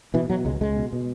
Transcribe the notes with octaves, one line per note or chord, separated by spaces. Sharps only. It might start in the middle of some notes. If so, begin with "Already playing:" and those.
B2 E3
B2 F#3
C#2 G#3
C#2 G#3
B2
B2